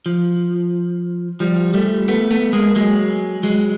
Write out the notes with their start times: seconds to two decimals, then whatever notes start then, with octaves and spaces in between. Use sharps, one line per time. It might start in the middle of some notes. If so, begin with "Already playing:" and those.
0.06 F3
1.40 F3 G3
1.74 G3 A3
2.08 A3 B3
2.31 A3 B3
2.53 G#3 A#3
2.76 F#3 G#3
3.43 F#3 G#3